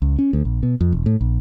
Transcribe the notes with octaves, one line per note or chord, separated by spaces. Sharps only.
C#2
C#4
D2
A#1
B2
F2
E1
A2
A#1